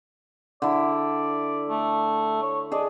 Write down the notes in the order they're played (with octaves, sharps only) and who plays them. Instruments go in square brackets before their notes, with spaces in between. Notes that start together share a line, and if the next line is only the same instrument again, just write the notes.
[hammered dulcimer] D3 E4 [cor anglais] D5
[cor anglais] A3
C#5
[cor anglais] D4 [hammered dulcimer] G#4 D5 D#5